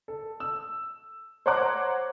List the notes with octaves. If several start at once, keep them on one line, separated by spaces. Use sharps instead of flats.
A4
E6
C5 C#5 F#5 A#5 D6 F#6